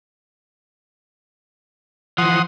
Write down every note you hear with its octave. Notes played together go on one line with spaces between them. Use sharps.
E3 F3 F#5 C6 D#6